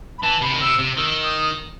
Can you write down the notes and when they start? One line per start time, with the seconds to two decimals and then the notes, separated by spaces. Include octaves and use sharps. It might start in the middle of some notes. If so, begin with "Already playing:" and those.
0.18 B5
0.22 E3 A5
0.41 C3 B5
0.53 D#3
0.60 C3 E6
0.79 C3
0.97 D#3 E6
1.23 D#6